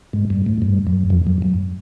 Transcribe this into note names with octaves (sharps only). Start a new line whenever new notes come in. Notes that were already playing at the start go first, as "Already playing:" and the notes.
G#2
G2
A2
G2
F#2
F2
F#2
F#2